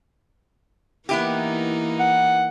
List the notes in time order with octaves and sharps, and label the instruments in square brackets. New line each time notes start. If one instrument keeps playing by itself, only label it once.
[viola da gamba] E3 A#3 D#4 [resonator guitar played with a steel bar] B3 E4 G4
[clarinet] F#5